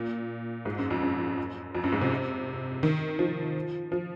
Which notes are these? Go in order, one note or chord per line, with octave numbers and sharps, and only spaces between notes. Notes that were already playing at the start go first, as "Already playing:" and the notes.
Already playing: A#2
G#2
F#2
F2
F#2
F2
F#2
G#2
C3
D#3
F3
F3